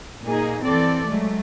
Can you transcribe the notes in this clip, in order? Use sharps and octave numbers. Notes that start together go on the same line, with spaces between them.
A#2 A#3 D#4 G#4
E3 C4 A4 D5
F#3 G#3 A3